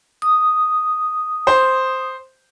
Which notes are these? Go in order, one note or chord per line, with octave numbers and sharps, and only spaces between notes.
D#6
C5